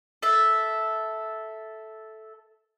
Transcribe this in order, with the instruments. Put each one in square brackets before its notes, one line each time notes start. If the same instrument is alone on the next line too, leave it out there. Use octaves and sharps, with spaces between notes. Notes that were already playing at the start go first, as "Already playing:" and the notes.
[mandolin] A4 E5